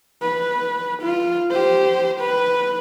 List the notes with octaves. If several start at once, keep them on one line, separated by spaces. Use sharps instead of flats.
B4
F4
G4 C5
B4